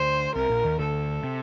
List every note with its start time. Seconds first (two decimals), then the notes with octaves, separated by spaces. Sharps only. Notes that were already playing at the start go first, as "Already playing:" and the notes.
Already playing: D2 D3 C5
0.35 C2 C3 A#4
0.49 A#1 A#2
0.64 D#2 D#3
0.79 D2 D3 A4
1.24 C3